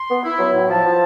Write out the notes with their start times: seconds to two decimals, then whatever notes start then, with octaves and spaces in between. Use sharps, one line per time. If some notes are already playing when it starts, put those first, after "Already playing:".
Already playing: C6
0.10 B3
0.24 E4
0.39 F#3
0.54 A2
0.69 F3 A5
0.85 F3